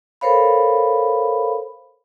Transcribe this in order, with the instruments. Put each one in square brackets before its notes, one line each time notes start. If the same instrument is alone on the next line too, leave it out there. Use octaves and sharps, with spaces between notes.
[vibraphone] A4 A#4 C5 C#5 F5 B5